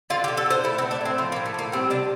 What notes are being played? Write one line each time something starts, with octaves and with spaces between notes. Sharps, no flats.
D3 F4
G4
D3
A4
D3 C5
A3 E4
C4
A3
D4
A2 C4
F3 C4
A#3
A2
A3
A2 A#3
G3 C4
C3 D4